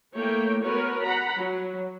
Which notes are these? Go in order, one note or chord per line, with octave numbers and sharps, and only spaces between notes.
A3 A#3 E4 C#5 G5
B3 F#4 A#4 B4 C#5
F#5 A#5 B5
F#3